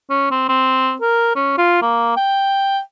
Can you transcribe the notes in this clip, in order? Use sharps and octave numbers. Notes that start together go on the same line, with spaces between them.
C#4
C4
C4
A#4
C#4
F4
A#3
G5